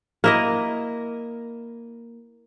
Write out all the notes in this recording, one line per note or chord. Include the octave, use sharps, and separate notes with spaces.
A#3 E4 D#5